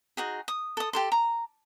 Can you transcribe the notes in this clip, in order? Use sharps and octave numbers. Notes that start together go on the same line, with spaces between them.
D#4 F#4 G#4
D#6
A4 D#6
G4 A4 C6
A#5